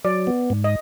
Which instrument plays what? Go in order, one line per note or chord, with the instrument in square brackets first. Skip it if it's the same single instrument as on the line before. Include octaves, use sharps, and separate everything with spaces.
[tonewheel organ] F#3 [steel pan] D5
[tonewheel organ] B3
G#2
[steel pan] D#5